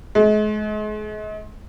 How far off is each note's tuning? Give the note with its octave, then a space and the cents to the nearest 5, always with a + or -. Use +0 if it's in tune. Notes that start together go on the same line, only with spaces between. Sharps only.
G#3 +40